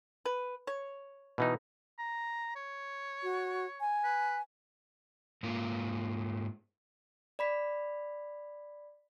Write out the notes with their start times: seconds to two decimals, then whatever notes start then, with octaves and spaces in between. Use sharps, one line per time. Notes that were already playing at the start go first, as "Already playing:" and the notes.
0.25 B4
0.67 C#5
1.38 B2 E3 D#4
1.98 A#5
2.55 C#5
3.23 F#4
3.81 G#5
4.04 B4
5.43 G#2 A#3 F4
7.39 D5 B5 B6